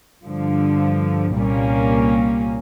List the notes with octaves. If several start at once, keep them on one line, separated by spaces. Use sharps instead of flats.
G2 D3 F3
C2 A#2 G3 A#3 C#4